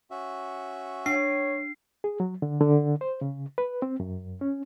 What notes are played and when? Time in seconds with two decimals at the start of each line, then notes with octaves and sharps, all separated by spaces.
0.11 C#4 F#4 E5
1.06 D4 C#5 C7
2.04 G#4
2.20 F#3
2.42 D3
2.60 D3
3.01 C5
3.21 C#3
3.58 B4
3.82 C4
4.00 F#2
4.41 C#4